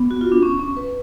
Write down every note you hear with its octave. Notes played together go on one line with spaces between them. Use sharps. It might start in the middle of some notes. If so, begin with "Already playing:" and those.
Already playing: B3
F#4
F4
D4
C#4
C#4
B4